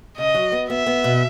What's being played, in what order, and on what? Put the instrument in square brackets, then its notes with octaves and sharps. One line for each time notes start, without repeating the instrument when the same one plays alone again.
[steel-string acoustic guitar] C#3 [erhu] D#5
[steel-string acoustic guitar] F#3
B3
[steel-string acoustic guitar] B3 [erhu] E5
[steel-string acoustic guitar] B3
B2